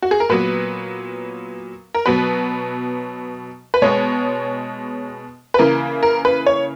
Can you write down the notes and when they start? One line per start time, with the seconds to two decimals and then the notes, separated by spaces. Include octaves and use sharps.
0.02 F#4
0.11 G#4
0.20 A#4
0.29 A#2 F#3 B3 B4
1.94 A#4
2.06 B2 F#3 B3 B4
3.74 B4
3.82 B2 G#3 B3 C#5
5.54 B4
5.59 C#3 E3 A#3 A#4
6.03 A#4
6.25 B4
6.46 C#5